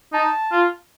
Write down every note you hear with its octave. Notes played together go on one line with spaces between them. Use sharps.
D#4 A5
F4